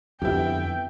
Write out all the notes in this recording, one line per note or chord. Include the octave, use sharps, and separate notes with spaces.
F2 D3 B3 E4 G4 G5